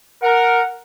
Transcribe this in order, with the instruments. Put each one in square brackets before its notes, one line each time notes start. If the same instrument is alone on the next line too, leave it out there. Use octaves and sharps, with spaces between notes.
[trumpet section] A#4 [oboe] F#5